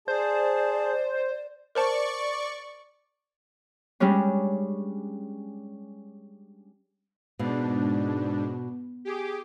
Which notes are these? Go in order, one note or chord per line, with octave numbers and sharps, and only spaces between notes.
G#4 C5 D5 A5
A#4 C5 D5 A5 C#6
G3 G#3 C#4 D4
G#2 B2 D4
G4 G#4 D6